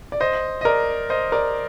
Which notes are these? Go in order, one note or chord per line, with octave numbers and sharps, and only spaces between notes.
D5
C5 D#5
D#5
A#4 D5
C5 D#5
A#4 D5